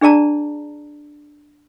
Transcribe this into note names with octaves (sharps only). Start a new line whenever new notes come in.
D4 G#4 D5 A5 A#5